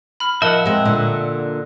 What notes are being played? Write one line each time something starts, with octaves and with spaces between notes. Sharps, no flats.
B5 F6
F3 A#4 D#5 E5 F#5 A5
G#3 C4
A#2 D3